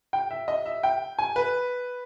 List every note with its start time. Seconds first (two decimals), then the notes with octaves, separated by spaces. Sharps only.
0.13 G5
0.31 E5
0.48 D#5
0.66 E5
0.83 G5
1.19 G#5
1.36 B4